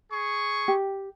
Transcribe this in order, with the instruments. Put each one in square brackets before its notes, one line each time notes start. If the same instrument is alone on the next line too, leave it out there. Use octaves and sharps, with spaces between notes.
[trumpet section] G#4 C#6
[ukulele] G4